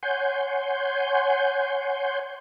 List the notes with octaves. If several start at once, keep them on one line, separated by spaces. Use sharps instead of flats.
C#5 F#5 G#5 C6 G6